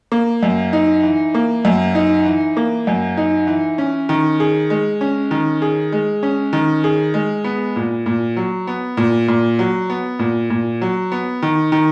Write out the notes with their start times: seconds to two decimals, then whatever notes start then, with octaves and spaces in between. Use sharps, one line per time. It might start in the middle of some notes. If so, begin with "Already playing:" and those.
0.12 A#3
0.43 F#2
0.73 D#4
1.04 E3
1.35 A#3
1.65 F#2
1.95 D#4
2.25 E3
2.57 A#3
2.87 F#2
3.17 D#4
3.47 E3
3.78 C#4
4.09 D#3
4.40 G#4
4.70 G#3
5.01 C#4
5.31 D#3
5.62 G#4
5.92 G#3
6.23 C#4
6.53 D#3
6.84 G#4
7.14 G#3
7.44 B3
7.76 A#2
8.06 A#2
8.37 F#3
8.67 B3
8.97 A#2
9.28 A#2
9.59 F#3
9.90 B3
10.19 A#2
10.50 A#2
10.82 F#3
11.12 B3
11.42 D#3
11.72 D#3